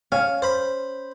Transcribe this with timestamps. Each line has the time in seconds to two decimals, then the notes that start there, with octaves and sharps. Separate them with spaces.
0.12 C#4 F5
0.42 C5 B5